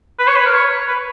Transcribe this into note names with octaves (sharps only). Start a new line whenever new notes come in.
B4
C#5
B4
A#4
C#5
B4